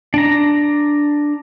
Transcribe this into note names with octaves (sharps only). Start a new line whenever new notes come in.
D4 A#5